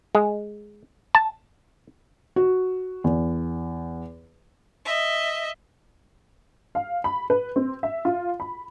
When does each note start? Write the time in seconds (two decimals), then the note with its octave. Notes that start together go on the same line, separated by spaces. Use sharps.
0.15 G#3
1.15 A5
2.36 F#4
3.04 E2
4.86 D#5 E5
6.75 F5
7.04 B5
7.30 B4
7.56 C4
7.83 E5
8.05 F4
8.40 B5